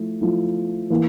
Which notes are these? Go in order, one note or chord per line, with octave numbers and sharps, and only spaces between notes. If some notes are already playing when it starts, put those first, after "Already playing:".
Already playing: F3 A3 E4
F3 A3 E4
E3 A#3 E4